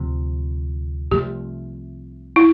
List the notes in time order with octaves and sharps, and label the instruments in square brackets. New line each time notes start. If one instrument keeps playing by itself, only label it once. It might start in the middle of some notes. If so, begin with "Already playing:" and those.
Already playing: [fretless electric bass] D2 C3 F3
[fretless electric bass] C2 C3 F3 A3 [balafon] G4
[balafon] E4